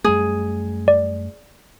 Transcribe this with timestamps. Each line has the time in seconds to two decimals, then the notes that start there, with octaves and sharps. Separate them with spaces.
0.04 F#2 G3 A3 G#4
0.88 D5